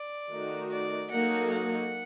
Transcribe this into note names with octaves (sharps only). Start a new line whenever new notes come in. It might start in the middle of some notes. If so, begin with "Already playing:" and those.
Already playing: D5
D#3 A3 D#4 F#4
D5
F#3 A#3 D#4 F#4 A4 F#5
F#5